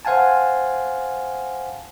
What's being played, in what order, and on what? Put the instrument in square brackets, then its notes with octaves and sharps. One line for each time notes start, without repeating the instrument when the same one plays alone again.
[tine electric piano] C5 F5 F#5 G#5 A5